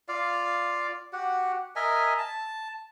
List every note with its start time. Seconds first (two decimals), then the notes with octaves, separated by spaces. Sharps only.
0.08 F4 D5 F5
1.13 F#4 G4 F#5
1.76 A#4 D#5 E5 G#5
2.18 A5